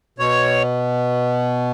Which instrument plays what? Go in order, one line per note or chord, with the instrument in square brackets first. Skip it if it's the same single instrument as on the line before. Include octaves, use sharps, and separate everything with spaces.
[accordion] B2 C#5